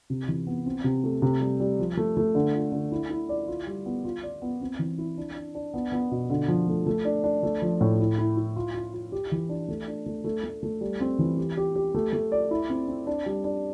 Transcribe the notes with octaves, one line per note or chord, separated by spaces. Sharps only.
C3
E3
B3
C4
C3
A3
C3
G3
G3
F3
A3
A3
D3
F4
D3
E4
E4
D5
F4
G3
B3
F4
D5
B3
C4
E3
E4
D4
D4
D4
B3
B3
B2
D3
F3
A3
A3
D4
D4
A3
F3
A2
E4
E4
E4
F4
F4
F4
G4
E3
D4
A3
D4
A3
A3
A3
A3
G3
C4
E3
G4
G4
G4
A3
A3
D5
E4
C4
C4
D4
G3
D4